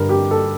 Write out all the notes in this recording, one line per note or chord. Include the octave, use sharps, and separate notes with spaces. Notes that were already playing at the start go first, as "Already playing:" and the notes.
Already playing: G2 D3 A#4
G4
A4